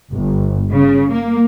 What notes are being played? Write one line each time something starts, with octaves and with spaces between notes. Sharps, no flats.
G1
C#3
A#3